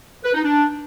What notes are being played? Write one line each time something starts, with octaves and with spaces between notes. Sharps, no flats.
B4
D#4
D4